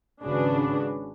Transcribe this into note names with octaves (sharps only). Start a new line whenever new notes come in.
G#1 C#3 D4 F#4 G#4 B4